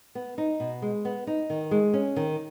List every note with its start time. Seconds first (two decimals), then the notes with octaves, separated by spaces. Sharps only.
0.15 B3
0.38 D#4
0.60 B2
0.82 G#3
1.05 B3
1.27 D#4
1.50 D#3
1.71 G#3
1.93 C#4
2.16 D#3